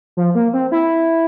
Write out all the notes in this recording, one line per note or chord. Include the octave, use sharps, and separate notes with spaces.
F3
A#3
C4
E4